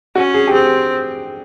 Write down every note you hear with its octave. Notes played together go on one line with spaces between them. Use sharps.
C#4 F#4
G#4
G4
C4 G#4